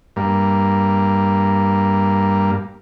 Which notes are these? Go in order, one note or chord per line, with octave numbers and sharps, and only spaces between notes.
G2 A#3